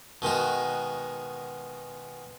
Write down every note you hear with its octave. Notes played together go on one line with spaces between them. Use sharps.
B2 D#3 G#3 F#4